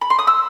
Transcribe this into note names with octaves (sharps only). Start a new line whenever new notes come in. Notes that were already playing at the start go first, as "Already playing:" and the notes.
B5
C6
D#6
E6